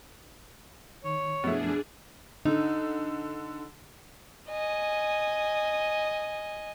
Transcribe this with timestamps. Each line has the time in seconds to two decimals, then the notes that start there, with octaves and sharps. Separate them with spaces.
1.04 D#3 C#5
1.44 F#2 B2 F3 A3 D4 E4 G#4
2.45 D3 D#4
4.49 D#5 G#5